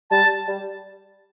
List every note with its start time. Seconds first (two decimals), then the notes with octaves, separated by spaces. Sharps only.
0.10 G3 A5
0.48 G3